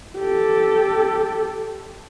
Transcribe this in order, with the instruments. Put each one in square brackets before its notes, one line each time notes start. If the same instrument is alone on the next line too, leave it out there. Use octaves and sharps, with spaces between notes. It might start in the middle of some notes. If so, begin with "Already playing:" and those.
[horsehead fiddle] G4 A4